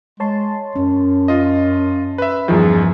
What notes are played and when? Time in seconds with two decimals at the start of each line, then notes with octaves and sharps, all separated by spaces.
0.20 G#3 C#5 A5 C6
0.76 F#2 C#4
1.28 F4 D#5
2.18 B4 E5
2.48 E2 G2 D#3 F3 G#4